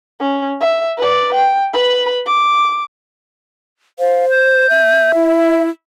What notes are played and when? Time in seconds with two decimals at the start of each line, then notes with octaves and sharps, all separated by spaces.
0.20 C#4
0.61 E5
0.98 B4 D5
1.34 G5
1.73 B4 B5
2.26 D6
3.99 C5 F5
4.30 G6
4.70 E5
5.15 E4